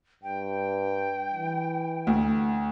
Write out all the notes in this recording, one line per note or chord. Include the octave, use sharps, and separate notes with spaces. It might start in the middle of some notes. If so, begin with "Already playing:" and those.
G2 G5
E3
D2